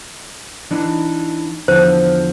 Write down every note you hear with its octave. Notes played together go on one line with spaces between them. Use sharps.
E3 D4 D#4
E2 D3 F3 C5